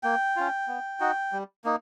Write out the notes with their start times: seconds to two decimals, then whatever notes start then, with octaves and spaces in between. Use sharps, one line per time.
0.03 A#3 G5
0.36 C#4 F4
0.68 B3
1.00 D#4 F#4
1.32 G3
1.64 A#3 D#4